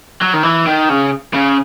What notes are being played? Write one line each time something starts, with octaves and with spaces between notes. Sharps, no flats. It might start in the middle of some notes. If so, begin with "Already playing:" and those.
F#3
D#3
E3
D#3
C#3
C#3